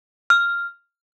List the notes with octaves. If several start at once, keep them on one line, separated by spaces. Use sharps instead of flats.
F6